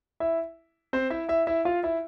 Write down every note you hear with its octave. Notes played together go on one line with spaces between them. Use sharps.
E4 E5
C4 C5
E4 E5
E4 E5
E4 E5
F4 F5
E4 E5